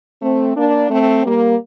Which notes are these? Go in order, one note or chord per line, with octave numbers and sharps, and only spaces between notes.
A3 C4
A#3 D4
A3 C4
G3 A#3